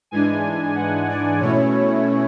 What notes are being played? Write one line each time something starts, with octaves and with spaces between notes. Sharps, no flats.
G#2 E3 G#3 D4 G#5
F#5
D5
B2 A3 C#4 E4 C#5